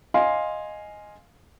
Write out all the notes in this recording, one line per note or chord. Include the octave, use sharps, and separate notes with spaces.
D#5 F5 G#5 C6